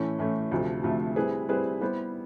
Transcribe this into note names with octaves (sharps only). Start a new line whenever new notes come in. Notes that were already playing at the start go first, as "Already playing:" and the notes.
Already playing: A2 E3 A3 C#4
A2 E3 A3 C#4
D2 C3 F3 A3
D2 C3 F3 A3
G3 C4 E4 G#4 B4
G3 C4 E4 G#4 B4
G3 B3 E4 G4 C5